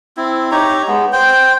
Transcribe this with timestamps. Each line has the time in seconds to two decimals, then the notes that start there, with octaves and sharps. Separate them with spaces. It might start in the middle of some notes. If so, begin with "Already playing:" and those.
0.17 C4 E4
0.51 D#4 G4 C#5 A#5
0.88 G#3 B3
1.12 C5 G5